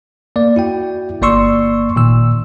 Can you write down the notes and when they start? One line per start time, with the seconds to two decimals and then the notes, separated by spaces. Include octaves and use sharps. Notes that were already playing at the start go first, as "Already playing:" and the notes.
0.36 A#3 D5
0.56 E4 F#4 G5
1.22 G1 A#3 D5 C6 C#6 E6
1.96 A#2 D#3 E6